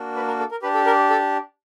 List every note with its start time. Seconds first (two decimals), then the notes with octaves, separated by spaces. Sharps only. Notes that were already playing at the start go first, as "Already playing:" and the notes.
Already playing: A#3 D4 F#4
0.16 B4
0.27 A#4
0.39 A4
0.51 A#4
0.62 D4 G4 B4
0.74 A4
0.86 A#4
1.10 A4